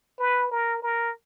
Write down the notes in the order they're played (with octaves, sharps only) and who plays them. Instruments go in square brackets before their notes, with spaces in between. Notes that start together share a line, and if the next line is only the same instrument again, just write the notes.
[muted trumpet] B4
A#4
A#4